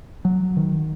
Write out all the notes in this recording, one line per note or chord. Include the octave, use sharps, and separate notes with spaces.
F#3
D#3